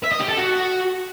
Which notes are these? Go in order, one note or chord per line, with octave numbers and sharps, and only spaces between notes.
E5
D#5
G4
A4
F#4